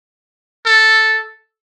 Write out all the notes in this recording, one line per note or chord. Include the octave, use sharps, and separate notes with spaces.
A4